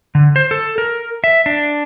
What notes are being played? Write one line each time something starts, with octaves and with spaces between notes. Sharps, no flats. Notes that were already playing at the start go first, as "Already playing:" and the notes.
D3
C5
A4
A#4
E5
D4